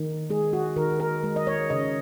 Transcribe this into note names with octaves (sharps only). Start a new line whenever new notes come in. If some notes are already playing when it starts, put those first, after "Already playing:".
Already playing: D#3
G#3 G#4
F#4
D#3 A#4
A#4
G#3
D#5
C#5
C#3 D#5